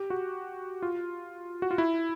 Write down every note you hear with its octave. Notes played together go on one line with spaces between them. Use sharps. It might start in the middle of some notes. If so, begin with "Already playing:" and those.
Already playing: G4
F#4
F4
F#4
F4
E4